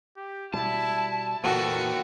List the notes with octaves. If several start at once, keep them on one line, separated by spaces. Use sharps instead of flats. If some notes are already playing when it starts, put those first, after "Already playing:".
G4
B2 G3 E4 A5
A#2 E3 A#3 F#4 A4 A#4 G5